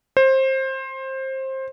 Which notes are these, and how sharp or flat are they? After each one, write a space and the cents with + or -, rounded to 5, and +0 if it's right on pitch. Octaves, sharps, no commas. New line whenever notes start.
C5 +20